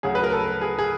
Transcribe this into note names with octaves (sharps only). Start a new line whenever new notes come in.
D2 C#3 F#3 G#4
B4
A#4
A4
G#4
G#4